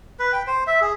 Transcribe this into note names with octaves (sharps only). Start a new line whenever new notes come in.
B4
G5
C5
E5
G#4